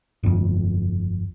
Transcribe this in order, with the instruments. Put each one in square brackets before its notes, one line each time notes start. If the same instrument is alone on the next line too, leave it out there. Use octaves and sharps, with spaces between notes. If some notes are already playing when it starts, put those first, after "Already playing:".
[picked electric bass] G1 F2